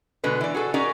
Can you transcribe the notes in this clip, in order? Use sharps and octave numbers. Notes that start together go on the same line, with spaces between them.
B2 D3 G#3 B4
E3 D5
F#4 G#4 A4
C#4 D#4 F#4 G#4 A#4 D5